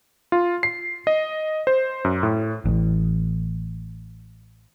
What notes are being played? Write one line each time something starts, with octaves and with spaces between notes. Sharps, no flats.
F4
C7
D#5
C5
F#2
A2
A1 E3